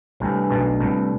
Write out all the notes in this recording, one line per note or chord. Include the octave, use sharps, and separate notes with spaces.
C2 C3 E3 A3 D4
B1 B2
C2 C3